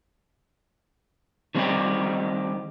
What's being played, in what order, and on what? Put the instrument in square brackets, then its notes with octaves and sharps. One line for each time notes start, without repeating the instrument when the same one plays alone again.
[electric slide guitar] D#3 G3 C4 D4 D#4 G4